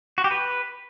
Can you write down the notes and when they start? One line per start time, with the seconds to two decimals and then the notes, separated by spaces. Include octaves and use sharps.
0.18 F#4
0.24 G4
0.31 B4